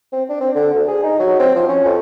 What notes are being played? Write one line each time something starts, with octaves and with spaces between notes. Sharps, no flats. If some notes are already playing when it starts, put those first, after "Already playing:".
C4
D4
C4
D3
D2
G#4
D#4
F#3
C4
F3
C#4
F2